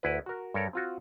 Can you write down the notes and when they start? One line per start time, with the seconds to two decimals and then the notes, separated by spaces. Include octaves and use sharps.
0.03 D2 E4 B4
0.26 F#4 A#4
0.54 G2 A4 A#4 C#5
0.73 C4 F4 F#4